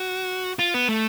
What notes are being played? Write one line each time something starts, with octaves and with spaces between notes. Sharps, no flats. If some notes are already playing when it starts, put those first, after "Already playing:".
Already playing: F#4
F4
B3
A3